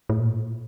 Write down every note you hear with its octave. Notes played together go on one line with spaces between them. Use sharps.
A2
A#2